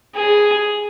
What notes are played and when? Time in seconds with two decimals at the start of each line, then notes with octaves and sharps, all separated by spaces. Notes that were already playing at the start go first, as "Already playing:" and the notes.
0.16 G#4